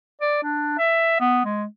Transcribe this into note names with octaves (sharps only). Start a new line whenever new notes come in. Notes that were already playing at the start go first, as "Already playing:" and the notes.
D5
D4
E5
B3
G#3